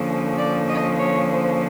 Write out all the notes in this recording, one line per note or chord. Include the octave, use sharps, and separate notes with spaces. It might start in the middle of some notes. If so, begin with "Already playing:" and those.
Already playing: D3 F3 A#3 C#4
D5
D#5
C#5
C5